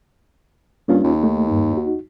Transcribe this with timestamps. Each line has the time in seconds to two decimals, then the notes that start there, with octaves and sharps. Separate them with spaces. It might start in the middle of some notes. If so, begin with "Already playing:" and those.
0.88 G2 A#3 C#4 F4
1.03 D#2
1.23 A3 D#4
1.48 G2 A#3
1.73 D#4 F#4